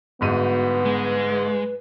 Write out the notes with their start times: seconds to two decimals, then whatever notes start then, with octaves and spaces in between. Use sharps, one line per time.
0.21 G1 G#2 B3 F#4 D#7
0.85 G#3 B4